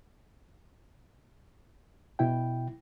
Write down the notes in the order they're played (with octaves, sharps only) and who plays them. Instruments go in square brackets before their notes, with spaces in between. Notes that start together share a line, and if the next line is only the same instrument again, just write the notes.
[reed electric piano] B2 E4 G5